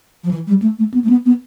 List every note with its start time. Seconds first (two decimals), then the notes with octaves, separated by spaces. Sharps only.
0.24 F3
0.31 E3
0.47 G3
0.62 A3
0.79 A3
0.94 B3
1.05 A3
1.09 B3
1.26 B3